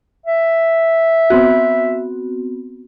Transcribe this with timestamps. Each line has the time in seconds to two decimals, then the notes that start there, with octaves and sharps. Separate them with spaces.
0.26 E5
1.30 B3 C4 F#4